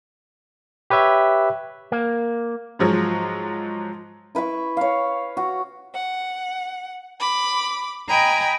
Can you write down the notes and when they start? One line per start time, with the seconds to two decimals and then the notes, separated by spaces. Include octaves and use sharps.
0.90 G4 B4 C#5 E5
1.92 A#3
2.79 G#2 F3 F#3 G#3
4.35 E4 B4 E5 C#6
4.77 C#5 F5
5.37 F#4
5.94 F#5
7.19 B5 D6
8.08 D#5 G5 G#5 A#5 B5